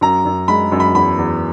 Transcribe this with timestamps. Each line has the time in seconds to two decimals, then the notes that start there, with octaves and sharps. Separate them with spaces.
0.01 F#2 A#5
0.25 F#2
0.48 G#3 B5
0.72 F#2
0.80 B5
0.95 E2 B5
1.18 E2